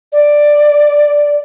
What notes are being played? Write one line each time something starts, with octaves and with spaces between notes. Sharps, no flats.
D5